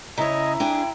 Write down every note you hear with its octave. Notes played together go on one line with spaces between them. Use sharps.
C#3 E4 C#5 D#5 A#5
D4 G#4 G5